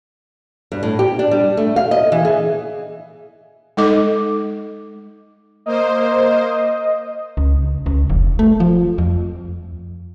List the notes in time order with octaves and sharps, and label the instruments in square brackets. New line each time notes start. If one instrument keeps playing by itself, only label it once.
[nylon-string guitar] G2
A2
G4
D4
G3
A3
F5
D#5
E3
G#4
[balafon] G#3 D#4 A4 D#5 D6
[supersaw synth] A#3 C5 [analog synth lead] D#5
[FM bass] C#2
C#2
F1
A3
F3
F2